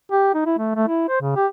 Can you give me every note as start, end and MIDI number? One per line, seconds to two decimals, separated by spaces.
0.11 0.33 67
0.34 0.41 63
0.46 0.54 64
0.58 0.71 57
0.76 0.87 57
0.88 1.05 64
1.09 1.20 72
1.21 1.35 49
1.36 1.47 67